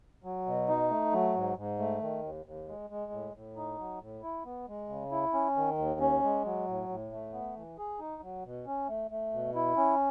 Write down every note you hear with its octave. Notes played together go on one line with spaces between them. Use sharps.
F#3
B2
D#4
A3
F#3
G#2
G#2
A3
D#3
D#2
D#2
G#3
G#3
A2
A2
D#4
F#3
A2
E4
B3
G#3
C#3
E4
C#4
D#3
D#2
C#4
G#3
F#3
A2
A2
A3
B3
E3
G#4
D#4
F#3
B2
C#4
A3
A3
B2
E4
C#4